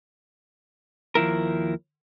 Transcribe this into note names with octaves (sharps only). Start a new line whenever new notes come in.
D#2 F3 E4 A#4